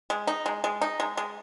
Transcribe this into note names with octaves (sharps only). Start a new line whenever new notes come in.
G#3
D#4
G#3
G#3
D#4
G#3
G#3